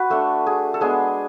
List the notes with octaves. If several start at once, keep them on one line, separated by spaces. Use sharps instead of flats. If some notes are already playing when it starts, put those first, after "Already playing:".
Already playing: F#4 B4
A3 D4 A4
G#4
A4
G#3 B3 D4 G#4